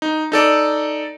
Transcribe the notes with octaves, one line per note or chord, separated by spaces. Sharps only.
D#4
D#4 A4 D5